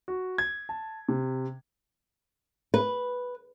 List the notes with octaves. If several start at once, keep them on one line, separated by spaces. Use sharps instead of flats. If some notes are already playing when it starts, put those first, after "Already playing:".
F#4
G#6
A5
C3
B4